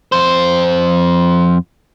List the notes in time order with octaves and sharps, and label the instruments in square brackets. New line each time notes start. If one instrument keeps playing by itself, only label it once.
[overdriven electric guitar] F2 C5